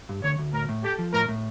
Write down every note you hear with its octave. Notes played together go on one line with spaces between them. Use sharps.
G2
D2 C#5
D2
A2 A#4
A2
G4 A4
F3
A2 A#4
A2